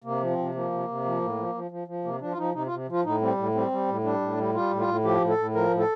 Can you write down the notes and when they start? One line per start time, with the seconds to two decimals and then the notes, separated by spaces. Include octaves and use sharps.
0.04 C3 A#3
0.21 F3
0.30 C4
0.38 C3
0.55 F3 A#3
0.71 C3
0.88 C3
1.04 F3
1.21 A2
1.38 F3
1.55 F3
1.71 F3
1.88 F3
2.04 C3 A#3
2.21 F3 D4
2.32 F4
2.37 F3 D#4
2.54 C3 D#4
2.66 F4
2.71 C3
2.88 F3 F4
3.04 A2 D#4
3.21 G3 C4
3.37 A2
3.55 G3 C4
3.71 G3
3.88 A2
4.04 G3 D4
4.21 A2
4.37 G3
4.54 G3 F4
4.71 A2
4.79 F4
4.87 A2
5.04 F3 G4
5.21 A2
5.29 A4
5.38 A2
5.54 F3 A#4
5.71 A2
5.79 A4